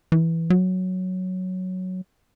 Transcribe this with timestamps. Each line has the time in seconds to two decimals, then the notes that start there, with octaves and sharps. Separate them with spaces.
0.12 E3
0.50 F#3